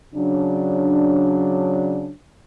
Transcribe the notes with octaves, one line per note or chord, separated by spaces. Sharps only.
C#3 F#3 D4